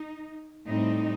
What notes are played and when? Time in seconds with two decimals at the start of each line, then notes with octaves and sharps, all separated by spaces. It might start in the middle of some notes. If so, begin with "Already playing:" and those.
Already playing: D#4
0.68 A2 G3 C4 D#4